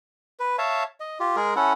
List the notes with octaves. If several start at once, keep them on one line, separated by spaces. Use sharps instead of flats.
B4
C#5 E5 F5 A5
D#5
F4 G4
G#3 G#4 A#4
C#4 E4 A4 F#5